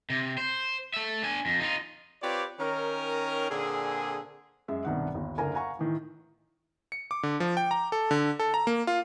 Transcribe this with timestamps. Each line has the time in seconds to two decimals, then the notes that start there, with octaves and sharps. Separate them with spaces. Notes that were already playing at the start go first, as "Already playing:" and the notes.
0.10 C3
0.38 C5
0.94 A3 E5
1.23 D4 G#5
1.46 F2
1.60 D#4 F4
2.22 C4 F4 G4 B4 C#5 D5
2.59 D#3 C#4 A#4
3.50 A#2 D3 C4 G#4
4.68 F#2 G#3 E5
4.85 B1 G2 C3 D#3 E5 F#5
5.15 G1 D#2
5.38 F#1 D3 A#4 G#5 A#5
5.53 F5 F#5 G#5 A#5 C#6
5.79 A2 D#3 E3
6.92 C#7
7.11 D6
7.23 D3
7.40 F3
7.57 G5
7.71 A#5
7.92 A4
8.11 D3
8.40 A4
8.54 A#5
8.67 A#3
8.87 F4